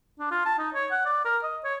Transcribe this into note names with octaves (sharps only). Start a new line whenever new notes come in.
D4
F4
A5
D#4
C#5
F#5
D5
A#4
D#5
C#5